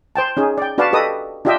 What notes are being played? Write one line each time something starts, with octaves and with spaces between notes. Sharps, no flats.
C5 G5 A5
C#4 D#4 G#4
D5 G5
D4 F#4 B4 D5 F5 A5
G4 A4 B4 D#5 D#6
D4 F4 G4 D#5 E5 G5